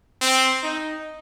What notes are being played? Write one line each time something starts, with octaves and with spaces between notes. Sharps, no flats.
C4
D#4